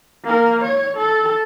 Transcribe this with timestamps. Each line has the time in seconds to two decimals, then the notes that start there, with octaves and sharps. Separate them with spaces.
0.24 A#3 A#4
0.62 C#5
0.97 A4